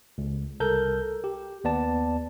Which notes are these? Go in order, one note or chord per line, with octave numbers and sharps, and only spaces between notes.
C#2
C2 A4 A#4 G6
G4
D#2 B3 D5 A5